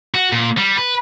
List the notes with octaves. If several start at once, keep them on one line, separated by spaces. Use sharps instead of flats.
F#4
A#2
G3
B4